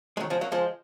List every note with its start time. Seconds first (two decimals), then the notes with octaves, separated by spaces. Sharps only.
0.17 G#3
0.20 D#3 F#3
0.30 F3 G#3
0.41 F#3 A#3
0.52 F3 G#3